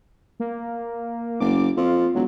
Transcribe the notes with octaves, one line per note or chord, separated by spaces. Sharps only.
A#3
F#1 D6
F2 F4
E1 F#3